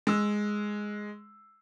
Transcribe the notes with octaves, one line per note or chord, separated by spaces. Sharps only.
G#3 E6